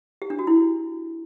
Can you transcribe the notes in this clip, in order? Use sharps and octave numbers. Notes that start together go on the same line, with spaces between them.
G4
D4
F#4
E4